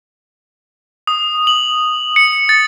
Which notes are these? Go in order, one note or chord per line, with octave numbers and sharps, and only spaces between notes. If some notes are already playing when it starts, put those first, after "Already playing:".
D#6
F#7
C#7
A6